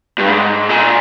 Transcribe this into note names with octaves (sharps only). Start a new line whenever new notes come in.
G2
G#2
A#2